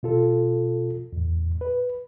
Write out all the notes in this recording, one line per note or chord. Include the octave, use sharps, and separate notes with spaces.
B2 F4 A4
E2 A2
B4